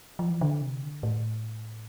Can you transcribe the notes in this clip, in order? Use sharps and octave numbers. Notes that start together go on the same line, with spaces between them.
F3
E3
D3
C3
D3
A2